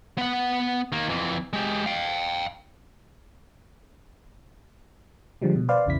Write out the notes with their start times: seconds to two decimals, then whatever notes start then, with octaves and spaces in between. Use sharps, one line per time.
0.18 B3 F#5
0.92 D#3 A#3
1.08 F2 E3
1.53 G#3 G4
1.86 F5 G5
5.42 D3 F3 G3 G#3
5.56 B2
5.69 B4 C5 D5 F5
5.86 A#1 E2 C#3 E3 E4 B6